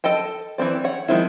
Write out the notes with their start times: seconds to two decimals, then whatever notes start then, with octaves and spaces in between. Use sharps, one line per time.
0.04 A4 D#5 G5 A5
0.58 E3 A3 C4 D5
0.84 C#5 F#5
1.08 D#3 F3 G#3 C4 E4